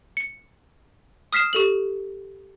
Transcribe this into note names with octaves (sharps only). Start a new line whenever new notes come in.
C#7
D#6 F6 B6 C7 E7
G4 A4 F#7